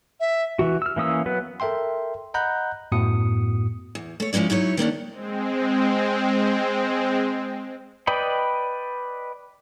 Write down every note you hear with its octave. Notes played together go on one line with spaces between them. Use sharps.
E5
E3 F#4
E6 F6
E3 A#3 C#4 D#6 E6
F#3 B3 B4
A4 A#4 E5 G5 C6
D#5 F#5 A#5 B5 F#6 G6
F#2 A2 B3 F#4 D#6 C#7
E2
A3 C#5
F3 G#3 C#4 E4 D5
F#3 D#4 E4 C#5
D#3 A#3 C#4 D4
G#3 C4
B4 D5 D#5 G5 B5